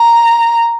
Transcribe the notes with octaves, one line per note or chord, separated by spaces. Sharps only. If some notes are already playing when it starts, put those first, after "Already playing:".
Already playing: A#5